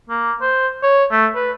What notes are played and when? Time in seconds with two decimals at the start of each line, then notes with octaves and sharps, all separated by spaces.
0.10 A#3
0.41 C5
0.83 C#5
1.11 A3
1.35 B4